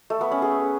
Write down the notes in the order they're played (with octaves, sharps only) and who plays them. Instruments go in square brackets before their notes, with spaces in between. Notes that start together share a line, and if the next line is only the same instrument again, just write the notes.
[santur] A3
B3
C#4
G#4